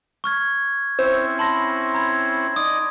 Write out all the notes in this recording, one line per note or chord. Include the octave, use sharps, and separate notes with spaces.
C#6 F6 G#6
C4 C#4 E4 C5
A5 B5 C6 A#6
A#5 G#6
D#4 D5 D#6